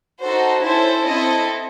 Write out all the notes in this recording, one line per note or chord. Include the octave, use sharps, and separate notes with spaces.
D#4 F#4 A4 C5
C#4 E4 A4 C5
C4 E4 A4 D#5